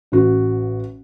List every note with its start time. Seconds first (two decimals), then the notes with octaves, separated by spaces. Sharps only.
0.12 A1 F#4